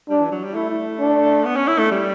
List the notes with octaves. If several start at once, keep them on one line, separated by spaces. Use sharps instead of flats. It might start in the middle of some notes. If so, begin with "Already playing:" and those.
G3 D4
E3
F#3
G3
A3 E4
D4
B3
C#4
E4
A3
G3